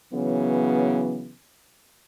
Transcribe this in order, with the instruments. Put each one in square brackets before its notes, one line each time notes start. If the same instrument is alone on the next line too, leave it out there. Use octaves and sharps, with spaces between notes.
[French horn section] C#3 E3 F#3 B3